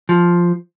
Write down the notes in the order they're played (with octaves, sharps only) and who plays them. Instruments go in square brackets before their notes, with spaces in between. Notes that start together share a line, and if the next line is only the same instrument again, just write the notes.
[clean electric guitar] F3